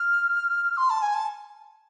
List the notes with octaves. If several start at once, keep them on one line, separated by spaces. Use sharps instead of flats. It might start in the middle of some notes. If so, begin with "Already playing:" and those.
Already playing: F6
C6
A5
G#5
A5